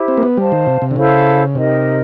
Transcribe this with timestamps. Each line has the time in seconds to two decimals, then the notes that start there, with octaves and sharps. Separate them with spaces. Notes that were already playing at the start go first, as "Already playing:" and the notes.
Already playing: E4 G4 C5 E5
0.08 C4
0.17 A#3
0.23 B3
0.37 G3 C5 F5 A5
0.52 D#3
0.67 C3
0.82 C3
0.91 D3
0.95 C#3 E4 A4 C5 F5
1.55 C3 D#4 G4 A#4 D#5